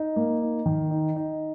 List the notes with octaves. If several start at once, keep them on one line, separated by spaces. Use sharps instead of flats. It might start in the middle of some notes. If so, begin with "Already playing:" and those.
Already playing: D#4
A#3
D#4
D#3
D#4
D#4